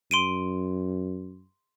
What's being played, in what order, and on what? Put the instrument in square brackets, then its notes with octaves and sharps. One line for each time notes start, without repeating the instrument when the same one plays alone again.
[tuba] F#2 [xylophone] C6 D7 D#7